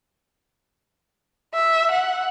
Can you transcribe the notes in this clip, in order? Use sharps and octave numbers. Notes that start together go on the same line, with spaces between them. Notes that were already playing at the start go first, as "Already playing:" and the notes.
E5
F#5